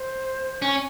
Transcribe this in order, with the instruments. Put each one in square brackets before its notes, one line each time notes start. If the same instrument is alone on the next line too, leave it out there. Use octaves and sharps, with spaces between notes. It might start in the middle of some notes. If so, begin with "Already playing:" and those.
Already playing: [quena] C5
[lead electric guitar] C#4